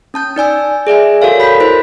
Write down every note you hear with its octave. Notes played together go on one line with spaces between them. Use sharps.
C#4 A5 G6
D#4 D5 G#5 E6
G#4 D5 E5 G#5
F#4 A4 A#4 C#5 F5
B5 G6 B6
E4 A#4 C5